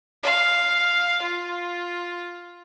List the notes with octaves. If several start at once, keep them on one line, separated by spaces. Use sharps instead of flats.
F5
F4